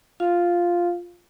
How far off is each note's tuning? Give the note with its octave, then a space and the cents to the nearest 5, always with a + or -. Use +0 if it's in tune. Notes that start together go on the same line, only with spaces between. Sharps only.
F4 +0 F5 +0